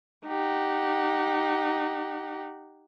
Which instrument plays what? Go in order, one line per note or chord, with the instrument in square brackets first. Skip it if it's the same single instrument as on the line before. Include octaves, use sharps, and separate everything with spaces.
[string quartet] D#4 G4 F#5